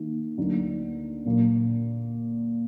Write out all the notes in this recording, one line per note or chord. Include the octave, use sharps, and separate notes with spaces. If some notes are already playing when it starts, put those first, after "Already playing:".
Already playing: D#3 A#3 D#4
D2 D3 F#3 A#3 D#4
A#2 F#3 A#3